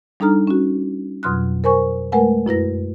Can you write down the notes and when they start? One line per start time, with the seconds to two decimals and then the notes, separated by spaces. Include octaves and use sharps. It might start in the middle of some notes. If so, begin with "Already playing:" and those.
0.20 G3 D4 D#4 A4 A#5 F6
0.47 C#4 F#4
1.23 F2 B2 F#3 C6 F6 F#6
1.64 A#4 C5 G#5 C#6
2.12 G#3 A3 A#4 B4 F#5 G#5
2.46 F#2 E4 B4 A#6